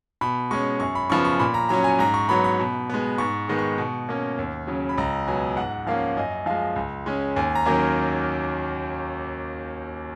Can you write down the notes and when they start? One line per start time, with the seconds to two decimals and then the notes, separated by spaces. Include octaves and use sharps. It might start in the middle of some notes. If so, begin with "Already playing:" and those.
0.21 B2 B5
0.51 G#3 C#4 C#6
0.80 F#2 C#6
0.95 B5
1.10 C#3 F3 B3 C#6
1.25 C#6
1.39 A#2 B5
1.54 A#5
1.69 F#3 C#4 A#5
1.84 G#5
1.99 G#2 A#5
2.14 C#6
2.29 F#3 B3 B5
2.44 B5
2.59 B2
2.90 G#3 B3
3.18 G#2 C#6
3.48 D#3 G#3 B3
3.59 C#6
3.78 B2
4.09 A#3 C#4
4.38 D#2
4.67 C#3 F#3 C#4
4.89 B5
4.98 C#2 A#5
5.28 B2 F#3 B3 G#5
5.57 G#2 F#5
5.87 F3 A#3 C#4 F5
6.17 F#2 D#5
6.46 F3 G#3 F5
6.76 C#2
7.06 C#3 G#3 C#4
7.36 D#2 G#5
7.55 A#5
7.66 D#3 F#3 A#3 C#4